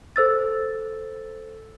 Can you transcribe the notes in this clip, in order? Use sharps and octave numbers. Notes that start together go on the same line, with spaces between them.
A4 C5 E6 A6